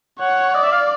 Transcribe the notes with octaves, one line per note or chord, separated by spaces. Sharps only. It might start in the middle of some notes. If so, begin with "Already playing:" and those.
C#5 F#5
D5 D#5
E5
F5